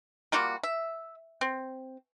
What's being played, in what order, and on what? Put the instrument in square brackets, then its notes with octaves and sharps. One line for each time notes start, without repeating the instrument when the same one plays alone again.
[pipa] G3 A#3 F4 F#4
E5
C4